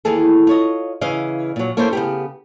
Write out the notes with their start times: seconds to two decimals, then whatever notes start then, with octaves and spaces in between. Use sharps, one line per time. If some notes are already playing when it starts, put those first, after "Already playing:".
0.05 D#2 E3 G#4 A4
0.47 F4 C#5 D#5
1.01 C#3 E3 D#5 F5
1.56 A#2 F#3
1.77 A#3 C#4 E4 A4 C5
1.93 C#3 B3 G4